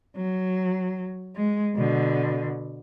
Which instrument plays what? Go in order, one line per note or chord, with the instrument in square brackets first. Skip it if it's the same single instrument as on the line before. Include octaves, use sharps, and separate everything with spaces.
[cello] F#3
G#3
B2 D3